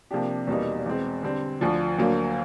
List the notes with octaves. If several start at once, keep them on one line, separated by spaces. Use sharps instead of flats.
C3 F3 A#3 D4 G4
E2 B2 G3 A#3 D#4
E2 B2 G#3 C4
D3 G3 C4
D2 D3 F3
D2 D3 F#3 A#3